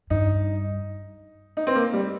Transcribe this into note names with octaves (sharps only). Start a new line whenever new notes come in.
G2 D#4
D#4
C4
A#3
G3